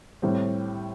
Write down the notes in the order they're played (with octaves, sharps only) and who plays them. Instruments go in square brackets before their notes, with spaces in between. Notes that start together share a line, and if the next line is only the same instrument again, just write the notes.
[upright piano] A2 G3 C4